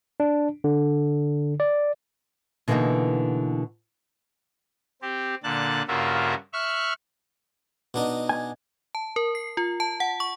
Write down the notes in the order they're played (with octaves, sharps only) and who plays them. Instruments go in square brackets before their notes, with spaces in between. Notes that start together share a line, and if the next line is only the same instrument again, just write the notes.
[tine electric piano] D4
D3
D5
[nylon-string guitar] B2 D3 E3 G3 A#3 D#4
[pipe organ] C4 G4
A#2 D3 A5 F#6
G2 C#3 A#3 F4 F#4 E5
E5 C#6 F6 F#6
[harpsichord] B2 D4 D#4
[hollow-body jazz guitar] G#5
[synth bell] A5
A#4
C7
F4
A5
F#5
C#6